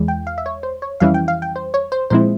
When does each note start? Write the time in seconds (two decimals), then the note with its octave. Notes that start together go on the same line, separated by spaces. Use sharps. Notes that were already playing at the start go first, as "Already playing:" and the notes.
Already playing: E2 E3 G#3
0.08 G5
0.27 F5
0.38 E5
0.46 C#5
0.63 C5
0.82 C#5
1.00 F2 E3 G3 C#4 E4 F5
1.14 G5
1.28 F5
1.42 G5
1.56 C5
1.74 C#5
1.92 C5
2.10 A#2 F3 G#3 C4 E4 C5